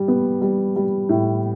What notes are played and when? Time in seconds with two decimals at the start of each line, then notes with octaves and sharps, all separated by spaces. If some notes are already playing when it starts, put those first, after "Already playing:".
Already playing: G3
0.08 B3
0.42 G3
0.76 G3
1.09 A2